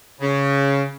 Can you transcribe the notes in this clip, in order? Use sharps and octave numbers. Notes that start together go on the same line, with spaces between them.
C#3